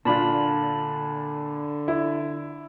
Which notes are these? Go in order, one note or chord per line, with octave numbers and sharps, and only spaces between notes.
A#2 D3 D4 F4 A5 B5
E4